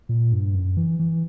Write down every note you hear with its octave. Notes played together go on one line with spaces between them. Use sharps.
A#2
G2
F#2
E3
E3